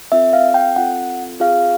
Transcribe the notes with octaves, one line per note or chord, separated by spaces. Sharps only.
C4 F4 A4 E5
F5
G5
C4 F4 A4 F#5
C4 F4 G#4 F5